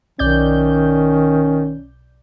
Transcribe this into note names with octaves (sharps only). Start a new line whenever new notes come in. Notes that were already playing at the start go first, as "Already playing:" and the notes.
B1 D#3 C#4 D5 G6